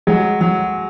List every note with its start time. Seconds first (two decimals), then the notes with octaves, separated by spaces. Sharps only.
0.07 F#3 G#3
0.41 F#3